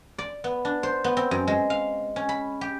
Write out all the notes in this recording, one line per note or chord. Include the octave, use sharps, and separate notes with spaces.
D5
B3
D4
C5
B3
C4
F#2
G#3
F5
C#4
B5
G4